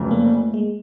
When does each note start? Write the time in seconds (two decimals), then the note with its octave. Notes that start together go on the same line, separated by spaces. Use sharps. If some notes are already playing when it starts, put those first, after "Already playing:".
Already playing: F1 F2 C#3 F#3 A3 B3
0.11 A#3
0.54 G#3